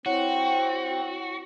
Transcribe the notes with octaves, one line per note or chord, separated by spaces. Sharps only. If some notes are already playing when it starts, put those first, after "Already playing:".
C4 E4 F#4 C#5 F#5